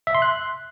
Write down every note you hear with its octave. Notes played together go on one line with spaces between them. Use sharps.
E5
C6
F#6